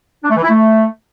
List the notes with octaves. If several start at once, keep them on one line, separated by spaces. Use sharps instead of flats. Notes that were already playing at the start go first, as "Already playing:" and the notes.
D4
A3
E3
E4
A3